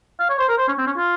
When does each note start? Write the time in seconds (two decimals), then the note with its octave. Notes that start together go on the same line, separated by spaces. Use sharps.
0.19 F5
0.30 C#5
0.39 C5
0.49 A#4
0.58 C5
0.68 C#4
0.78 C4
0.87 C#4
0.97 F4